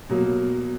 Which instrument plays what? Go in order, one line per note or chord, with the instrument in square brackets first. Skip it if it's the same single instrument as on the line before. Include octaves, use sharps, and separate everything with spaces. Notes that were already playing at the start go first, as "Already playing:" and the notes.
[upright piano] B2 F#3 A#3